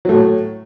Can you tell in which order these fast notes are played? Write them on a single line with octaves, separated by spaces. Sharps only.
F#3 A3 A2